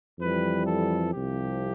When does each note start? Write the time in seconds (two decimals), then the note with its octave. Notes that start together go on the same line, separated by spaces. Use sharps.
0.19 F2 E3 G3 B4
0.66 A4
1.12 C2 C3 F3 G4